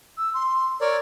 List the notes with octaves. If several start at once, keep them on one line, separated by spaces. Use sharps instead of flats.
E6
C6
A#4 C#5 D5 A#5